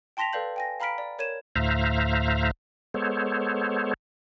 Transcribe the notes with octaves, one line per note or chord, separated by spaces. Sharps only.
G5 A5 C6 A#6 B6 F7
A4 B4 D5 F5 G6 F#7
G5 G#5 A#6
F5 A#5 B5 F6 B6 D7
D5
A#4 C#5 G#6 D#7 E7
D2 A2 C5 E5 F5 A#5
G#3 B3 A4 C5 C#5